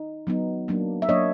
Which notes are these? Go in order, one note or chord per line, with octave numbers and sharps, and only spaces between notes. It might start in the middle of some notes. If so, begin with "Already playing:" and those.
Already playing: D#4
F#3 B3 D#4
F#3 A#3 D4
E5
F#3 A#3 D4 C#5 D#5